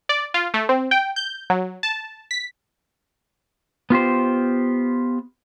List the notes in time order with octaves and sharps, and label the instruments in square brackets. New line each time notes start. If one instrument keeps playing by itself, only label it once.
[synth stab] D5
F4
A3
C4
G5
G6
F#3
A5
B6
[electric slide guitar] B3 F4 G4 C5